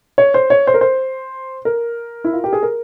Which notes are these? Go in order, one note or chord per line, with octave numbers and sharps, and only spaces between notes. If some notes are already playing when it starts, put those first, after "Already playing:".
C#5
C5
C#5
C5
A#4
C5
A#4
E4
F4
G4
G#4
A#4